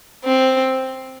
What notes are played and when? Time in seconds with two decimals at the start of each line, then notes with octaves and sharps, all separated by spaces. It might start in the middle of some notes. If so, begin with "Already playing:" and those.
0.25 C4